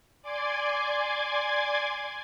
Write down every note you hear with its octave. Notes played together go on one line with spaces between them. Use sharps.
D5 G#5 C6 D6 G#6